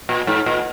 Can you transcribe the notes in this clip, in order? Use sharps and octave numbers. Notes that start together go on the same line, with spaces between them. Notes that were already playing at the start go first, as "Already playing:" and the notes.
A#2
G#2
A#2